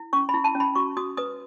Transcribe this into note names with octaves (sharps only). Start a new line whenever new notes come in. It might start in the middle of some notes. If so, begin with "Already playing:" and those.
Already playing: E4
C#4 C#6
E4 B5
A5
C#4
B5
F#4 C#6
F#4 D#6
B4 D#6